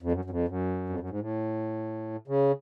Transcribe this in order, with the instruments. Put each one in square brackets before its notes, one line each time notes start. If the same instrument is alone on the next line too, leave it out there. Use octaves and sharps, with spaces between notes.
[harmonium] F2
F#2
F#2
F2
F#2
F2
F#2
G#2
A2
C#3